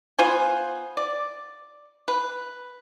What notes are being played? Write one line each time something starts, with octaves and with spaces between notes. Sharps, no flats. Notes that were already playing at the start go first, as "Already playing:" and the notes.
B3 F4 C5 G#5
D5
B4